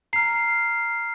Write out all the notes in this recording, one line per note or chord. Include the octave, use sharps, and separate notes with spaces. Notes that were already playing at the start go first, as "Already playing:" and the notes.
A#5 F6 C7